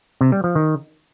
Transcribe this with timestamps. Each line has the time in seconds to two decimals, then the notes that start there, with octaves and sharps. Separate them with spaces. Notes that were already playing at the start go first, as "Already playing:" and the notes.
0.21 C3
0.32 G3
0.44 F3
0.55 D#3